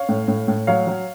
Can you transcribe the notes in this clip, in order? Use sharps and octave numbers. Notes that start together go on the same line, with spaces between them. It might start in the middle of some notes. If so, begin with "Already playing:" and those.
Already playing: C#5 F5
A2
A2
A2
F#3 C#5 F5
F#3